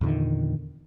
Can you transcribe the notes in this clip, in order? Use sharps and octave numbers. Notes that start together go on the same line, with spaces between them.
E2 A#2 D3 D#3